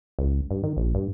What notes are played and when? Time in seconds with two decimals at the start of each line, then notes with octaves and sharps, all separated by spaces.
0.19 C#2
0.51 G2
0.64 D#3
0.77 A#1
0.95 G2